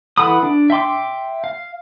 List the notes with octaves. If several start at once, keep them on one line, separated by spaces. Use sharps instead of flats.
E3 A4 F#5 B5 D#6
D4
E5 G5 C6 D6
F5